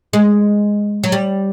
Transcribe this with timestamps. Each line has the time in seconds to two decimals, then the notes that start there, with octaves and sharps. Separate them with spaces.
0.13 G#3
1.04 F#3
1.12 G3